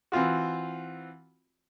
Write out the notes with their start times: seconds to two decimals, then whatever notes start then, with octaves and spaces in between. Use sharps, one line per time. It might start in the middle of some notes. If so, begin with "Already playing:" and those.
0.12 E3 C4 F4 F#4